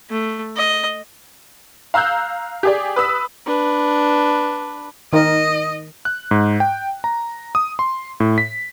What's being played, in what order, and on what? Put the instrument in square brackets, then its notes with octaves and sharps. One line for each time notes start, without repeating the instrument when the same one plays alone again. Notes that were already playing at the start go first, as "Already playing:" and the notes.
[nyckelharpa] A3
D#5
[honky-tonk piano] F5 A#5 E6 F#6 G6
G4 G#4 D5
B4 D#6 E6 B6
[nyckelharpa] D4 B4
[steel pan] D#3 D#4 A#4 [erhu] D#5
[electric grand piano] F#6
G#2
G5
A#5
D#6
C6
A2
B6